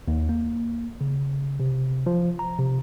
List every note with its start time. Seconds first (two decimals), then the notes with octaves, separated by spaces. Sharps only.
0.08 D#2
0.29 A#3
1.01 C#3
1.60 C3
2.06 F3
2.39 A#5
2.59 C3